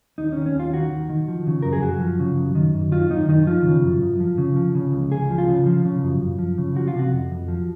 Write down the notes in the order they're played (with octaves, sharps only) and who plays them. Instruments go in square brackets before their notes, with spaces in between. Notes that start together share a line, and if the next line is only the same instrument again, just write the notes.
[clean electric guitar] D#2 D#4
C#4
D#3
C#4
D#2 F4
D#3 F#4
D#2
D#3
F3
C#3
F#2 A#4
G#4
F#2 F#4
F3
C#3
F#2
D#3
F#2
D#3 F4
F#2 D#4
D#3 D#4
F3 F4
C#3
F#2
F#2
F3
C#3
F3
C#3
C#2
C#2 G#4
F3
F4
C#3
F3
C#3
F#2
F#2
F3
C#3
F3 F#4
F4
C3 F#4
F2
F2
F3